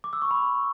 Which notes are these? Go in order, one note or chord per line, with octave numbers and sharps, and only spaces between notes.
D6
E6
C#6
B5